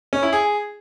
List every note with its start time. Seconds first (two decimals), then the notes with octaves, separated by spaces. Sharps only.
0.13 C#4
0.23 E4
0.33 G#4